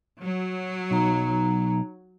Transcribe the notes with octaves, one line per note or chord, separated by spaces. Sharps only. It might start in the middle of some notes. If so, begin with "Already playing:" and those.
F#3
B1 D#4 A#5